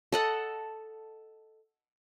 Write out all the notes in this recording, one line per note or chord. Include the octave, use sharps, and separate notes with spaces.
A4 D#5 F#5